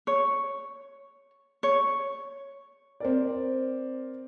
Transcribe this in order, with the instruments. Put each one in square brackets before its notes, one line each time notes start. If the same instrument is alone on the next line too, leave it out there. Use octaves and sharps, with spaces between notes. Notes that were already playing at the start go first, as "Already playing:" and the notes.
[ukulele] C#5
C#5
[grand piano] C4 A#4 D5